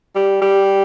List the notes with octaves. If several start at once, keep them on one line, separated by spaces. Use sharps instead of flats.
G3
G3